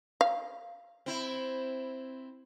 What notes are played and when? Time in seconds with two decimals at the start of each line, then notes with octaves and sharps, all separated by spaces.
0.21 F5
1.06 C4 E4